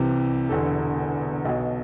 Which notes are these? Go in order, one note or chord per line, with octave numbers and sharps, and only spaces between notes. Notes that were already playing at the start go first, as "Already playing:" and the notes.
Already playing: C2 C3 E3 G4
E1 E2 D3 A4
B1 B2